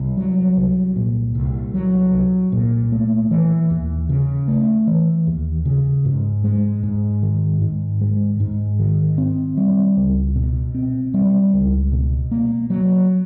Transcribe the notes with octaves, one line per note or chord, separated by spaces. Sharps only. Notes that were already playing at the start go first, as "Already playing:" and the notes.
Already playing: C2
F#3
C2
A#2
C2
F#3
C2
A#2
A3
E3
D#2
C#3
A3
E3
D#2
C#3
G#2
G#3
G#2
D#3
G#2
G#3
G#2
D#3
C4
G3
C#2
B2
C4
G3
C#2
B2
A#3
F#3